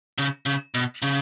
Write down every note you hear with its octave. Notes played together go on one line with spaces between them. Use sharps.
C#3
C#3
B2
C#3